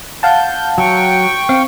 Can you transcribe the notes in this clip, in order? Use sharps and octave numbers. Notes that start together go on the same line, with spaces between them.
F5 F#5 A5 G6
F#3 G5 C#6
C4 F5